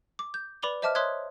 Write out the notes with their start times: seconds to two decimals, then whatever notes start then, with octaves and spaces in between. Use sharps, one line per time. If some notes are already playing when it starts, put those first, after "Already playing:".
0.19 D6
0.34 G6
0.62 B4 D5 B5 D6 F7 G7
0.82 C5 D#5 E5 A5 D6 F6
0.95 C#5 E5 C6 D#6 F#6 G#6